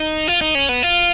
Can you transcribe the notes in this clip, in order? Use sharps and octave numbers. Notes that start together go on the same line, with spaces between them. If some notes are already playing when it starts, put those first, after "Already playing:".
Already playing: D#4
F4
D#4
C#4
B3
F4